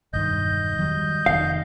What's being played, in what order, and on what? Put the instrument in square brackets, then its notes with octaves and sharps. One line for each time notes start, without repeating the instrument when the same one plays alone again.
[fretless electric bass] E1 G2 D#3 [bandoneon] D#5 G6
[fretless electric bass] D#3 F#3 G3
[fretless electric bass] F1 D#3 [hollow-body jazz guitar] F5